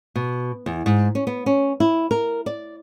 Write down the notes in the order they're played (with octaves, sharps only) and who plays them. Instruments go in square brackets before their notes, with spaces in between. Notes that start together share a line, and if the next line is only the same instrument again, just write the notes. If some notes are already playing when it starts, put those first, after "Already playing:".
[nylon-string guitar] B2
E2
G#2
C#4
B3
C#4
E4
A#4
D5